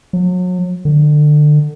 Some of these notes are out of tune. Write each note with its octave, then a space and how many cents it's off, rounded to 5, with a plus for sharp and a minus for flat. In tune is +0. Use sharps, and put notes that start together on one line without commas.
F#3 -35
D3 +25